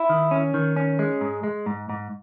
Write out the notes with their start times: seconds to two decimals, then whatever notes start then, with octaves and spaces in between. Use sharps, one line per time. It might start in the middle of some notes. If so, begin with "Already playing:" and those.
Already playing: E4
0.09 D#3
0.31 C#4
0.54 D#3
0.76 C#4
0.99 G#3
1.21 G#2
1.44 G#3
1.66 G#2
1.89 G#2